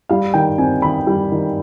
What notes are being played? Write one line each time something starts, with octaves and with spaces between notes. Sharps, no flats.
G3 F5
D#3 G5
C4 G#5
D#3 B5
G3
D#3